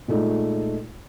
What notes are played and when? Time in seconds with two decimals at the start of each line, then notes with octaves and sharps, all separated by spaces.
0.08 A#2 G#3 A3 D#4